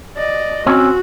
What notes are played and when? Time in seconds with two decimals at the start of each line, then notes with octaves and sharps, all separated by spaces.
0.17 D5 D#5
0.66 C4 C#4 F#4